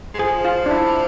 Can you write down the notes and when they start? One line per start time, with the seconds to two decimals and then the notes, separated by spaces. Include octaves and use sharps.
0.14 G#3
0.19 F3 G#4
0.45 F4
0.66 D4
0.71 E4